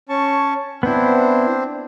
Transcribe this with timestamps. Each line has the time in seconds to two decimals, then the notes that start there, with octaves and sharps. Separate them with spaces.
0.09 C#4 A5 C#6
0.83 B3 C4 D4 E4 C5